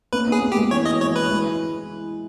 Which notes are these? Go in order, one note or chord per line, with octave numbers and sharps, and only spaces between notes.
A#3 C#4 B4
B3 D#4
G#4
A#3 C#4
G4
G#3 B3
E3 C#5
D#5
E3
C#5
E3 B4
E3 G#3